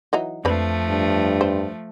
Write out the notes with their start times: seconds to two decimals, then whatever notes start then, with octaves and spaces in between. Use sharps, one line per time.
0.13 E3 F#3 D#4
0.45 F2 F3 A3 C4 D4 B4
0.89 G2
1.41 C5